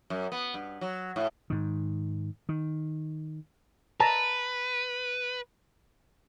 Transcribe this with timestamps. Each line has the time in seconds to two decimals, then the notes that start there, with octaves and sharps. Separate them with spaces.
0.10 F#2
0.32 B3
0.54 G2
0.81 F#3
1.16 A2
1.50 G#2 D#3
2.49 D#3
4.00 B4 A5 A#5